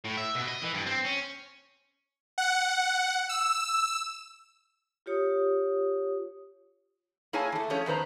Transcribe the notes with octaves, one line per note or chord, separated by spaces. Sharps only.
A2
E5
B2
D#5
E3
G2
C4
C#4
F#5
E6
F4 G4 C#5 D#6
A#3 E4 G#4 C#5 G#5 A5
E3 A3
F3 A3 C#4 G#4 C#5
E2 D#3 B4 C5 A#5